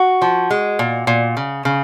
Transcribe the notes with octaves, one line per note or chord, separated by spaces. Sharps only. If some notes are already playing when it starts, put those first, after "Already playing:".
Already playing: F#4
F3
G#3
A#2
A#2
C#3
C#3